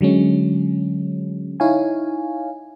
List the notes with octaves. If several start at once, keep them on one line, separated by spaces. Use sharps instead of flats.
D3 F#3 G#3 C#4
D#4 E4 C#5 F5 G#5